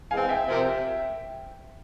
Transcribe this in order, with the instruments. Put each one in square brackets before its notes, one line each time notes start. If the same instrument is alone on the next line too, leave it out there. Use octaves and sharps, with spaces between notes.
[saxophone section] E3 G#3 C4 [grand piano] F5 G#5
[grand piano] E5 G5
[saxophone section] C3 F3 C4 G4 A#4